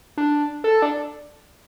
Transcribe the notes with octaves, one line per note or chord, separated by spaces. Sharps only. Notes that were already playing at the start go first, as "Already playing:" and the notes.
D4
A4
D4